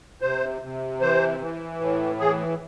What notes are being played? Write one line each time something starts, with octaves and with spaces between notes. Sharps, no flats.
C3 C5
C3
E3 C5
E3
A2
E3 G#4